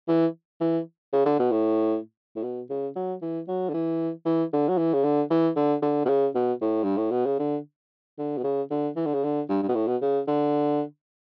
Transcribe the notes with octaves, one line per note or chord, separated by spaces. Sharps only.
E3
E3
C#3
D3
B2
A2
A2
B2
C#3
F#3
E3
F#3
D3
E3
E3
D3
F#3
E3
C#3
D3
E3
D3
D3
B2
C#3
B2
A2
G2
A2
B2
C#3
D3
D3
B2
C#3
D3
E3
D3
C#3
D3
G2
G2
B2
A2
B2
C#3
D3